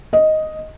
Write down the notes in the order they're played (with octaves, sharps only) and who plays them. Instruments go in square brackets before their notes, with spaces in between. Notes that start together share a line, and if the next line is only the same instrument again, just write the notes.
[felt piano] D#5